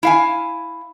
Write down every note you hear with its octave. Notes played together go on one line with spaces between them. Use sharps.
E4 F5 G#5